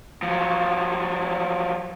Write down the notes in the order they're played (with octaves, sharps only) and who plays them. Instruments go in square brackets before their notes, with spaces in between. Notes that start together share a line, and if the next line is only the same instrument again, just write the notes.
[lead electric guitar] F3 F#3